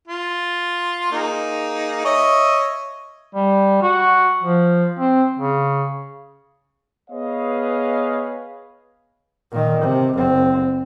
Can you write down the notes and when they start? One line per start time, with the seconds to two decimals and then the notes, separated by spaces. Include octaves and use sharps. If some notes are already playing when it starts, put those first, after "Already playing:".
0.08 F4
1.12 A#3 D#4 G#4
2.05 C#5 D#5 E5
3.35 G3
3.82 F#4
4.42 F3
4.99 C4
5.38 C#3
7.11 B3 G#4 B4 C#5 D#5 F5
9.52 A#2 D#3
9.82 C3
10.15 F#1 C4